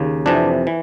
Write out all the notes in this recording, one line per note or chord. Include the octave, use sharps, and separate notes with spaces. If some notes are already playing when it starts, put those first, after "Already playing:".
Already playing: D#2 C#3
F2 C3 E3 D4
E3